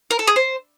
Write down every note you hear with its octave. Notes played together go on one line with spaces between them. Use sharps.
A#4
A4
G#4
C5